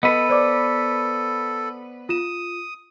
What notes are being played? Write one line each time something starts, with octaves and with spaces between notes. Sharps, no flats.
B3 A4 B4 D#5
C5 D5 D6
F4 D#6 E7